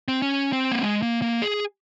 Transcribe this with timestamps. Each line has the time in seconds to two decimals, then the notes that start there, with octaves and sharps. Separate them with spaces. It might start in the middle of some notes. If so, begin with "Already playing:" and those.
0.08 C4
0.22 C#4
0.53 C4
0.72 A#3
0.83 G#3
1.02 A#3
1.22 A#3
1.42 G#4